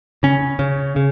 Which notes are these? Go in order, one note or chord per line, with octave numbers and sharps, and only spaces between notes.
C#3 C#4
C#3
C#3